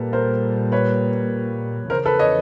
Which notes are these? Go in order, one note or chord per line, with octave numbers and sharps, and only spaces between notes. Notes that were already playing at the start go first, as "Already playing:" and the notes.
Already playing: A#2 G3 A#3 A4 B4
A#4 C5
B4 C#5
E2 C#3 F3 A#4 C5
A4 B4
C#5 D#5